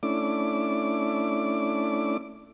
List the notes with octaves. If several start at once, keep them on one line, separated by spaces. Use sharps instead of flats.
A3 C#4 D4 E4 D6